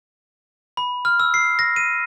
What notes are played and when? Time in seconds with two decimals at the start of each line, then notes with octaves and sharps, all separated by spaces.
0.77 B5
1.05 F6
1.20 E6
1.34 C7
1.59 A#6
1.76 D#7